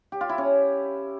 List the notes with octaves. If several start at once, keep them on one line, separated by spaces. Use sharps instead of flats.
G4
F4
E4
C#4